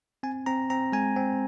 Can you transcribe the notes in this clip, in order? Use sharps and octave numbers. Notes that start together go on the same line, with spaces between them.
C4 G#5
C4 A#5
C4 A#5
G#3 G#5
C4